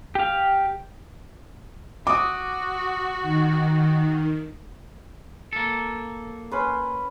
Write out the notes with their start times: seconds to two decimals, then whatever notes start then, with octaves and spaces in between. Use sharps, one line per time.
0.15 G4 F5
2.07 F#4 D6 D#6
3.22 D#3
5.53 A#3 A4
6.51 C#4 B4 C6